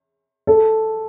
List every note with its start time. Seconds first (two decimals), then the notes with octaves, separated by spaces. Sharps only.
0.47 A4